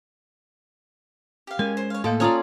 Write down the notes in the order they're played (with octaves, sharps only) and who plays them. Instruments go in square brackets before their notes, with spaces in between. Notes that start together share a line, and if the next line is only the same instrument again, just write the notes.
[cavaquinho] G4 F5
[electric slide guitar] G#3 C#4 [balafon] A#4 [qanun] G#5
[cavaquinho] C5
C#5 F5
[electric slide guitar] A2 [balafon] A#3 F5 C6 [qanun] A4 [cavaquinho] D#5
[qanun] C#4 F4 D5 [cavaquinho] C#5 A#5 D#6